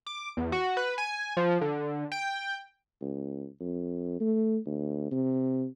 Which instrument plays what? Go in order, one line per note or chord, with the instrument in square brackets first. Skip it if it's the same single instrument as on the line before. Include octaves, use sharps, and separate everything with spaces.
[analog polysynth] D6
E2
F#4
B4
G#5
F3
D3
G5
[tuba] C#2
F2
A3
D2
C3